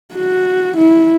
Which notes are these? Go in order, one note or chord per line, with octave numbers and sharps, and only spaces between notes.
F#4
E4